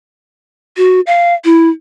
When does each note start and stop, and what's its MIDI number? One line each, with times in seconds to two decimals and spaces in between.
0.77 1.01 66
1.07 1.34 77
1.45 1.69 64